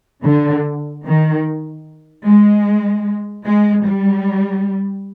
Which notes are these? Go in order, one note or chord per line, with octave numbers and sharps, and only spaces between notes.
D3
D#3
G#3
G#3
G3